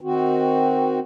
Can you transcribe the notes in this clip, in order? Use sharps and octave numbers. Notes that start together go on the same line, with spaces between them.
D#3 C4 F#4